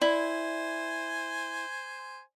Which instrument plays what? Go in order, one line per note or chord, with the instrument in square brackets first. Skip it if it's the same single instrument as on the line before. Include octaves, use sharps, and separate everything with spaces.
[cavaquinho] E4 [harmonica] C5 G#5 [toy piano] D5